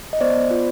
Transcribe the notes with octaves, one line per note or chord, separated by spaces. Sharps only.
D#5
B3 C5 D5
B3
F4